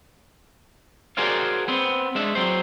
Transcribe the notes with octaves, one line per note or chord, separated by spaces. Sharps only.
F#4 G#4 A#4 C5 D5 F5
B3 C4
G#3 D4 E5
F#3 C4 C5